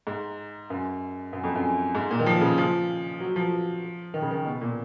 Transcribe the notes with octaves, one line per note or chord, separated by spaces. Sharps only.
G#2
F#2
F#2
F2
F#2
G#2
A#2
D#3
F3
C#3
F3
F#3
F3
D#3
C#3
D#3
B2
A#2